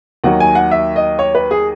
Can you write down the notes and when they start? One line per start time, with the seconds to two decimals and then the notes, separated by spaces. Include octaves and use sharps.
0.24 D#2 D#3 F#3 F#5
0.40 G#5
0.55 F#5
0.71 E5
0.96 D#5
1.19 C#5
1.35 B4
1.51 G#4